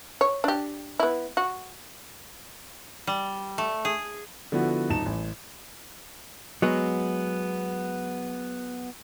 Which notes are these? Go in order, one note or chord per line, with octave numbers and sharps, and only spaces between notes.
C#5
D4 G4
B3 E4
F#4
G3
A3
G#4
D3 F3 B3 E4 F#4
D#1 D#4 A5 E7
A1
F#3 G#3 B3